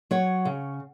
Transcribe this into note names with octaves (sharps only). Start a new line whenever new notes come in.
F#3 C#5
C#3